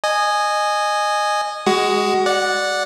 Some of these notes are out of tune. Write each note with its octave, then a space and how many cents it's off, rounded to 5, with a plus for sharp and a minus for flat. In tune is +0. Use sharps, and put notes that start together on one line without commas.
D#5 -20 G#5 +0
G#3 +0 F#4 +25
D5 +0 F#5 -10